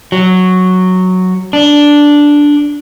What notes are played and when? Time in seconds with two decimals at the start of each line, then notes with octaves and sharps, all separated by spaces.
0.12 F#3
1.53 D4